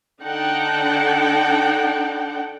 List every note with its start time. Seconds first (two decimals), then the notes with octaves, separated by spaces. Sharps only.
0.22 D3 D4 D#4 F#5 G5 A5